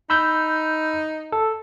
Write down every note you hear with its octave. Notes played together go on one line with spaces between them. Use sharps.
D#4 B5 E6 G6
A4